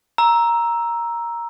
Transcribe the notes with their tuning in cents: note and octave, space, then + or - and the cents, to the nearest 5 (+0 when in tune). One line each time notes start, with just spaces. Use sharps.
A#5 +5 E6 +0